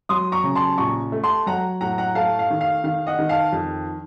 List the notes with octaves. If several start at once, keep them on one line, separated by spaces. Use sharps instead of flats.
F#3 C6 D#6
A#5 C#6
C#3
A5 C6
A#1 A#5 C#6
A3
A5 C6
F#3 F#5 A#5
A2 F#5 A#5
F#5 A#5
A3 F5 A5
F5
D#3
F5
D#3 F5
D#5 F#5
D#3
F5 A5
F2